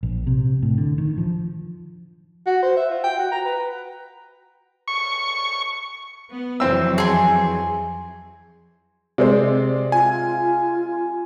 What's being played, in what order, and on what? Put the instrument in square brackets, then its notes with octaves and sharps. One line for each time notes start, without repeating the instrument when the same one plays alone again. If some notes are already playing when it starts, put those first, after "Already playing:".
[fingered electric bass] A#1
C3
A2
D3
D#3
F3
[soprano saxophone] F#4
C5
E5
F4
G5
F#4
A#5
B4
[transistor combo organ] C#6
[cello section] B3
[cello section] F2 E3 F#3 [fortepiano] C4 E6
[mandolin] G#4 C6
[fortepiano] C3 G#3 C4 [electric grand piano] D5
[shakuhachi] F4 [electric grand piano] G#5